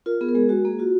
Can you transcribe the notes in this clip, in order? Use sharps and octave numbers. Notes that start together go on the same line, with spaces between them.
F4 A#4
B3 G#4
A#4
G#3 G#4
G#3 F#4
A#3 G#4
F4 F#4